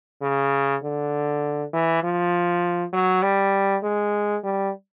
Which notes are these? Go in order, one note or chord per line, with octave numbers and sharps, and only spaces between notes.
C#3
D3
E3
F3
F#3
G3
G#3
G3